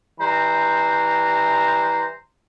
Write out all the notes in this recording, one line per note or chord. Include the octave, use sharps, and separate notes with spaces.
E3 G3 C5 A#5